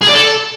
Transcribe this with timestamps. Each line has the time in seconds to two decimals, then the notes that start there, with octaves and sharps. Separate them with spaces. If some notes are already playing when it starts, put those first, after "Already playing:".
0.03 G#4
0.09 D5
0.15 A4